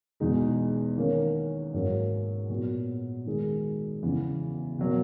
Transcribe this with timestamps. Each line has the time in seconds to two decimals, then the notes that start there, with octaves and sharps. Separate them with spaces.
0.20 E2 B2 G#3 D#4 G#4
0.97 D#3 A#3 C#4
1.73 G#2 F#3 A#3 C#4 F#4
2.50 A#2 F#3 B3 F#4
3.26 D#3 G#3 D#4 G#4
4.03 E2 C#3 E3 B3
4.79 B2 F#3 A#3